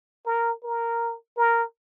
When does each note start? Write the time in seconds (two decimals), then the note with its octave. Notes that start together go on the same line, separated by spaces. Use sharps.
0.26 A#4
0.64 A#4
1.37 A#4